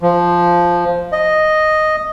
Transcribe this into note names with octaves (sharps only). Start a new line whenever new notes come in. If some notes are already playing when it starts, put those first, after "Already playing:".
F3
D#5